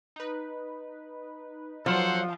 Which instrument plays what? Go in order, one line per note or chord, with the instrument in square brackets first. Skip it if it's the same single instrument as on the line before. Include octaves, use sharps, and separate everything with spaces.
[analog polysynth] D#4 B4
[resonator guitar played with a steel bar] F3 [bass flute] F#3 [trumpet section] A4 C5 F#5